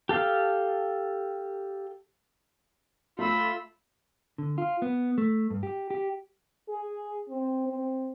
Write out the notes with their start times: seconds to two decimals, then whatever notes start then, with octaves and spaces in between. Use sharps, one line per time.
0.09 G4 A4 F5 A5
3.19 A3 F4 B5 E6
4.38 D3
4.58 F4
4.82 B3
5.18 A3
5.50 G2
5.63 G4
5.90 G4
6.69 G#4
7.29 C4
7.67 C4